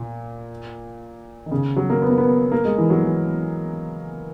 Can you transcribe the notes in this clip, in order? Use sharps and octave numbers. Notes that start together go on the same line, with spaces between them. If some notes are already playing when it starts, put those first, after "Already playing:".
Already playing: A#2
D#3
C#3
F#3
A#3
B3
A#3
B3
A#3
G#3
E3
F#3
E3